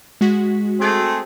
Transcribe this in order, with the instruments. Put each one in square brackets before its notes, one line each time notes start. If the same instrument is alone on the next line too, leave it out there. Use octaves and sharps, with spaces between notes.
[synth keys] G#3 F#4 B6
[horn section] A3 C4 G#4